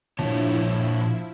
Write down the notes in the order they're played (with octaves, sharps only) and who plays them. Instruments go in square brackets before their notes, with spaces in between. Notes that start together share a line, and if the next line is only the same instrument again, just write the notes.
[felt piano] A#1 G2 [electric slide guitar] A#2 C#5 A5 [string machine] F3 E4